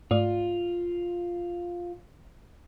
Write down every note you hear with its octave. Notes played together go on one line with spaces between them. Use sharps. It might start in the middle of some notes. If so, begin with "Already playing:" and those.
G#2 A3 F4 D5